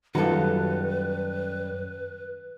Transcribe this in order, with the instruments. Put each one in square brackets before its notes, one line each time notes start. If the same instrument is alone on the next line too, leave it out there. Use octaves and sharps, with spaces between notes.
[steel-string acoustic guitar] F#2 G3 [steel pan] D#3 F4 [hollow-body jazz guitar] F#4 A4 [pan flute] B4